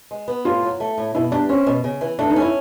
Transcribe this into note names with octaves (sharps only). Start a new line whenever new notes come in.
G#3
B3
A2 F4
F#3
A3
A2
B2 E4
G3 D4
C4 C#4
B2
C#3
E3
A3 D4
D#4
C#4
E4